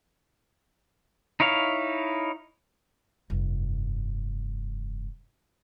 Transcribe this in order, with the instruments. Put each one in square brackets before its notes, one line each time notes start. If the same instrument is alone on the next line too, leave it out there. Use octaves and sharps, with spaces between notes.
[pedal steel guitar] D#4 E4 C#5 F5
[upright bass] F1 G2